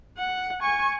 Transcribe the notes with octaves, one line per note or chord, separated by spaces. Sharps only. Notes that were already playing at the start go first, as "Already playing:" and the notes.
F#5
G#5 C#6